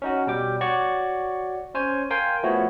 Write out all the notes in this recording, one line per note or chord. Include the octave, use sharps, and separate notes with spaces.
C#4 D#4 F#4
B2 G3 G5 D6
F#4 C#5 D5 C#6
C#4 C5 C#5 G#5
A#4 F5 G5 G#5 C6
F3 A3 B3 E4 F#4 C#5